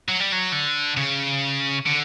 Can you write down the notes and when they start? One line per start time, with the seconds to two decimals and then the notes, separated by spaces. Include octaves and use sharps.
0.09 F#3
0.20 G3
0.32 F#3
0.52 D3
0.97 C#3
1.86 D3